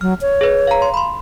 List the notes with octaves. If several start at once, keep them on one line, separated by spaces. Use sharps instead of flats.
F#3 F6
C#5
G#4 B4
F5 A#5
C6
B5 C6